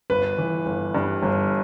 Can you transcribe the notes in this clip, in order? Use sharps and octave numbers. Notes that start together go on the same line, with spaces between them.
G1 B4
E3
G1
G2
G1